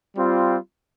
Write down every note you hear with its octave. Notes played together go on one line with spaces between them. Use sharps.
G3 C4 F4